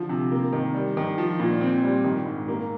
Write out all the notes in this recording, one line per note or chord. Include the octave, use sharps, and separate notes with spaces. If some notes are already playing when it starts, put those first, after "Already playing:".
Already playing: D3 F3
C3
A#3
D#3
G3
D#3
F3
A#2
C4
G3
D#3
G#2
A#3